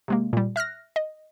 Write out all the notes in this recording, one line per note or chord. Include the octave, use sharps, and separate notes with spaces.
C3 G#3 A#3
A#2 G3
E5 F6 F#6 A#6
D#5